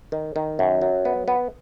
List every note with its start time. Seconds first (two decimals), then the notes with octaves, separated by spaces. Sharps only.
0.12 D#3
0.36 D#3
0.59 F#2
0.82 F#3
1.05 B3
1.28 B3